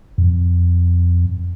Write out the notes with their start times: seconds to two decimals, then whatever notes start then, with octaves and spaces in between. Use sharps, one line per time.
0.18 F2